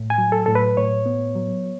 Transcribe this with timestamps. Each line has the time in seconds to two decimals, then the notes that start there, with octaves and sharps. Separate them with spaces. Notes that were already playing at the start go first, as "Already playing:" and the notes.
Already playing: A2
0.10 G#5
0.18 F#3
0.32 A4
0.46 A2 A4
0.55 B4
0.77 A2 C#5
1.06 B3
1.35 F#3